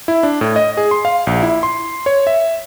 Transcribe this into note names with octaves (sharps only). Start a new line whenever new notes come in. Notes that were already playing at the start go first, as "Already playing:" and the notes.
E4
D4
A2
D#5
G#4
C6
F5
A#1
E4
C6
C#5
E5